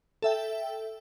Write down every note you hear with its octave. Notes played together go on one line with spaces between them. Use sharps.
A4 E5 G5